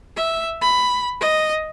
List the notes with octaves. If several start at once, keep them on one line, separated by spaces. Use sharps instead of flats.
E5
B5
D#5